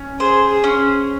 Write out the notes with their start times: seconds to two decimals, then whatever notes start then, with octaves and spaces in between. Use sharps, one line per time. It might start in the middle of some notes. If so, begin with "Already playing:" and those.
Already playing: C#4
0.19 G#4 C5
0.50 G#4
0.64 C#4